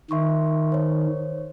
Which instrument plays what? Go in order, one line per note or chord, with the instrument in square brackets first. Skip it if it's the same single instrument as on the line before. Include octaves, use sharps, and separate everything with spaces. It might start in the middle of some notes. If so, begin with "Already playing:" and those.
[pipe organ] D#3 [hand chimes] E5 C6 C#6
[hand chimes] C5 C#5